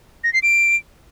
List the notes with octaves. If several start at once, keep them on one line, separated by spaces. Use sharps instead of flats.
A#6
C7
D7